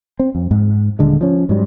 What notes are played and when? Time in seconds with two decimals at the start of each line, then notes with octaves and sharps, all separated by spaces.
0.19 C4
0.35 F2
0.51 G#2
0.99 D#1 D3 G#3
1.21 F3 C#4
1.49 G#2 F#3 G3